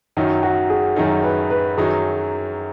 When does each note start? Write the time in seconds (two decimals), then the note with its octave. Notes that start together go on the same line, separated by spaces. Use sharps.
0.17 F#2 D#3 F#3 D#4 F#4
0.43 F#4
0.70 G#4
0.96 F#2 D#3 F#3 D#4 G#4
1.24 B4
1.50 B4
1.77 F#2 D#3 F#3 D#4 G#4